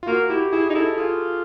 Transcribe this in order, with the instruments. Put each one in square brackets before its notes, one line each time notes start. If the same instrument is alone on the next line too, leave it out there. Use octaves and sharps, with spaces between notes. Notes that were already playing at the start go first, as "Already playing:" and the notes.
[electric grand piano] F4
[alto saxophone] A#3 [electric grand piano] F#4
[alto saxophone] E4 [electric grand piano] G4
[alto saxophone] E4 [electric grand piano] G#4
[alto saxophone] D#4
[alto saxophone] E4 [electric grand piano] A4
[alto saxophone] F4 [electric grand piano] G#4